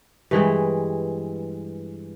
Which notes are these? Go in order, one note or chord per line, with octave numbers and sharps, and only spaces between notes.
G2 E3 G#3 G5